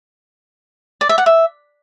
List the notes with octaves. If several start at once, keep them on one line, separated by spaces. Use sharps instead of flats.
D5
E5
F#5
E5